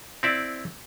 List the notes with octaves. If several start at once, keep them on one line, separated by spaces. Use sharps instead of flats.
C4 E4 D5